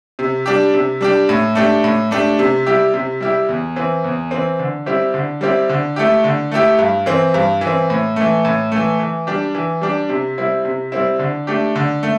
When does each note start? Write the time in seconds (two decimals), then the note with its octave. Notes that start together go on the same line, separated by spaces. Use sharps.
0.19 C3
0.46 G3 D4 G4
0.74 C3
1.01 G3 D4 G4
1.29 A2
1.55 A3 D4 G4
1.84 A2
2.11 A3 D4 G4
2.39 C3
2.66 G3 E4 G4
2.94 C3
3.21 G3 E4 G4
3.49 E2
3.76 E3 C4
4.04 E2
4.31 E3 C4
4.59 D3
4.86 G3 C4 E4 G4
5.14 D3
5.41 G3 C4 E4 G4
5.69 D3
5.96 A3 E4 G4
6.24 D3
6.52 A3 E4 G4
6.79 G2
7.06 E3 C4
7.34 G2
7.61 E3
7.67 C4
7.90 A2
8.16 E3 A3
8.45 A2
8.72 E3 A3
8.99 E3
9.27 G3 D4 G4
9.55 E3
9.82 G3 D4 G4
10.09 C3
10.38 G3 C4 E4
10.65 C3
10.92 G3 C4 E4
11.19 D3
11.47 A3 D4 G4
11.76 D3
12.03 A3